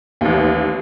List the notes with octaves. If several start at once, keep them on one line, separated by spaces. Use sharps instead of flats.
A1 D#2